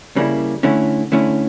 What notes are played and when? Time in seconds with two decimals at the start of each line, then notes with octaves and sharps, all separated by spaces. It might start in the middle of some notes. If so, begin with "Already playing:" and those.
0.16 C#3 G3 A#3 E4
0.63 D3 A3 C#4 E4
1.12 D3 A3 C#4 E4